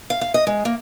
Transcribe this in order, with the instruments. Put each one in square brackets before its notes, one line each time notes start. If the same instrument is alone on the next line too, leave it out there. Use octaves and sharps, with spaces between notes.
[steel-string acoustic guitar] F5
F5
D#5
G#3
A#3